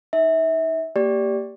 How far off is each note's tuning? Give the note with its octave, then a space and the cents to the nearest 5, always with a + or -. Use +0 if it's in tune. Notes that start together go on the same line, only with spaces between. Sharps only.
D#4 +0 E5 -25
A#3 -20 G4 +0 D5 -15